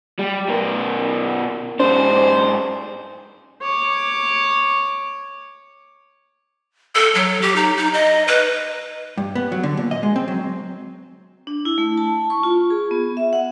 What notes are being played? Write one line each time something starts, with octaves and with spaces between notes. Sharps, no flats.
G3
B2 A#4
G#2 D4 C5
C#5 D6
A4
F#3
G4
D#4
D#4
D#5
B4
G2
B3
F#3
D3
A#2
D#5
G#3
C4
F#3
D4
E4
A3
A5
C#6
F4
G#4
B3
E5
F#5